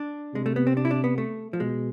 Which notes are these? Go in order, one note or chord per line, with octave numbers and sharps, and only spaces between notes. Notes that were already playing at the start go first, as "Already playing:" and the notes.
Already playing: D4
C3 G#3
A3
B3
C4
D4
E4
D4
B3
A3
F3
B2 G#3